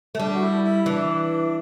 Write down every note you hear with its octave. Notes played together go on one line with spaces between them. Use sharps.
A3
G3 D4
F#4
E4
E4
E3 D4